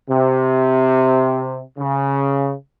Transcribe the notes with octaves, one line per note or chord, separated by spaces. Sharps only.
C3
C#3